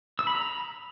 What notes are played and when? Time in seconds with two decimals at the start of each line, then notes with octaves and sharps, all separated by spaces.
0.19 E6
0.27 B5
0.35 A#5